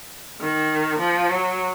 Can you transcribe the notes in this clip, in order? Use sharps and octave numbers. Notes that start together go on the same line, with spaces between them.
D#3
F3
F#3